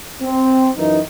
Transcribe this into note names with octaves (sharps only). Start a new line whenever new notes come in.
C4
F#2 E3 D#4